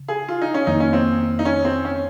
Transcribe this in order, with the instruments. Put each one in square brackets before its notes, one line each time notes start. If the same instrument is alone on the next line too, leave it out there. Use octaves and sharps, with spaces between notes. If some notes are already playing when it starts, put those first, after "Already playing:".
Already playing: [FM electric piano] C#3
[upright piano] G#4
F4
D#4
C#4
[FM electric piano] F2 D#3 A#3 [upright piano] D#4
[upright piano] C#4
C4
D#4
C#4
C4
C#4